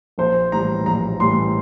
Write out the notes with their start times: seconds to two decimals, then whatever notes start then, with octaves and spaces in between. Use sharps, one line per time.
0.18 A#1 C5
0.52 A2 E3 G3 A#5
0.86 A#1 A#5
1.20 A2 E3 G3 C6